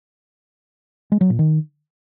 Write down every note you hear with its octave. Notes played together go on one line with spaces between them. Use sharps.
G#3
F#3
A#2
D#3